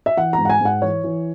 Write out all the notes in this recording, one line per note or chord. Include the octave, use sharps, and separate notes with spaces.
E5
E3 F#5
A#5
G#2
F#5
G#5
G#2
F#5
E3 C#5
E3